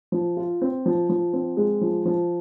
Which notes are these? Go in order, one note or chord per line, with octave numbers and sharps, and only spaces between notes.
F3
F4
C4
F3
F3
C4
G#3
F3
F3